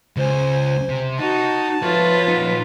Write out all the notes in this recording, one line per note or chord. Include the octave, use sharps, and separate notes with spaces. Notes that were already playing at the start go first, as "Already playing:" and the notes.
C#2 C5 G#5
C3
D#4 F#4 A5
F3 F4 B4 C#5 E5
A#2 D#4